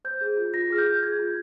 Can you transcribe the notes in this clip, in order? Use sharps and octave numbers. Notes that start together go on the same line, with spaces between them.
C5 G6
G#4
F4
F4 A#6
G#4 F6
G6
F4
G6
G#4 G#6
F4